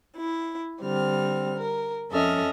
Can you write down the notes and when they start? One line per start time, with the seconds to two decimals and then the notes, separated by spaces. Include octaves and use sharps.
0.16 E4
0.82 D3 G3 C4 F6
1.57 A#4
2.11 F2 C#4 A4 D#5 E5 F6